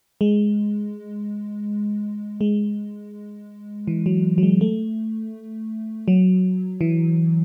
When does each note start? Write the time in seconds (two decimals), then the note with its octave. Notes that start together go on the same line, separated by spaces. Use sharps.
0.21 G#3
2.41 G#3
3.87 E3
4.06 F#3
4.38 F#3
4.43 G#3
4.61 A3
6.08 F#3
6.81 E3